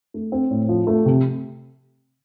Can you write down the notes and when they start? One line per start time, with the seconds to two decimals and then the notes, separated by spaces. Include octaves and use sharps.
0.14 A3
0.32 C4
0.51 A2
0.69 F3
0.87 A3
1.06 C3